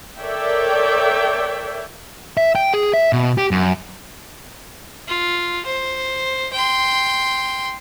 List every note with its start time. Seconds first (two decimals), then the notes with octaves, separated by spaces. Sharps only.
0.19 A4 A#4 C#5 D5 E5 G5
2.37 E5
2.55 G5
2.74 G#4
2.94 E5
3.13 B2
3.38 G4
3.51 F#2
5.08 F4
5.65 C5
6.53 G5 C6